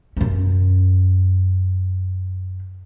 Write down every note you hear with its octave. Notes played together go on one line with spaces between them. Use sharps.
F#2 C#4